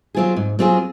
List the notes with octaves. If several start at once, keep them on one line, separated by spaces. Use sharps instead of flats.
F#3 C4 F4 G#4
G#2
F#3 C4 F4 G#4